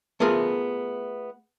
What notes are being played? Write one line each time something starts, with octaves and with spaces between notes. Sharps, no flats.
A3 B3 F4 G#4 A#4